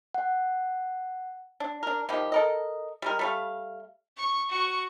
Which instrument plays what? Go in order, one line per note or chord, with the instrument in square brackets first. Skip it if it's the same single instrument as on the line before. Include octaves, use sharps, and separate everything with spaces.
[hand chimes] F#5
[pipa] D4
D4 A#4
D#3 F3 G3 G4
A4 A#4 D#5
G3 G#3 A#4
G3 A3 F5
[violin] C#6
F#4 C#6